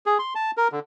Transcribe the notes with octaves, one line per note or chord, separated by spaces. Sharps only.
G#4
C6
A5
A#4
D3